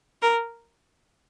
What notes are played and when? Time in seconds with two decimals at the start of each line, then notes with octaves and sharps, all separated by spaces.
0.22 A#4